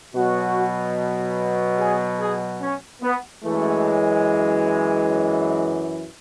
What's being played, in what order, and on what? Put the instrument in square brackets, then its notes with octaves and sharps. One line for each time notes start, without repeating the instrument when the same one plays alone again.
[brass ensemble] B2 F#3 F#4
G#4
G#4
C#4
B3
F#2 E3 G#3 A3